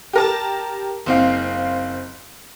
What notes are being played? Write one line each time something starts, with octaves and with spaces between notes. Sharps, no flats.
G4 A#4 A5
F#1 C4 F5